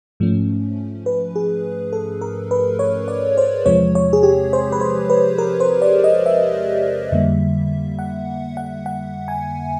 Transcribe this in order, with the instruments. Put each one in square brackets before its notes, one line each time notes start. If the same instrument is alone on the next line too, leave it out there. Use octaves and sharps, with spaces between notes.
[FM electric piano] G#2 F3 A3 C#4
B4
G#4
A4
A#4
B4
C#5
D5
C5
E2 C3 F3 G#3 C4 C#5
C#5
G#4
G4
C5
B4
C5
B4
A#4
C5
D5
D#5
E5
F2 D3 G3 A#3
F#5
F#5
F#5
G#5